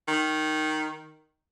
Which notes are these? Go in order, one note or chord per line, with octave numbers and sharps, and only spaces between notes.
D#3